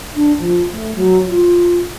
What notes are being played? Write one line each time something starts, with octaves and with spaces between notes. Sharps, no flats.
D4
F3
A3
F#3
F4